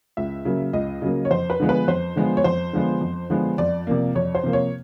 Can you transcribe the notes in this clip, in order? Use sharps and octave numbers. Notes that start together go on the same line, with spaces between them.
C#2 E5
C#3 F#3 A#3
C#2 D#5
C#3 F#3 A#3
C#5
F2 C5
B4
D3 F3 G#3 B3
B4
F2 C5
D3 F3 G#3 B3
C#5
F2 C5
D3 F3 G#3 B3
F2
D3 F3 G#3 B3
F2 D5
C3 F3 A#3
F2 C#5
C5
C3 F3 A#3
C#5